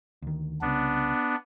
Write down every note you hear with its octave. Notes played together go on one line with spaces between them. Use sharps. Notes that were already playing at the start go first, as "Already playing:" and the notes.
D2 D#3
C2 C#3 B3 D4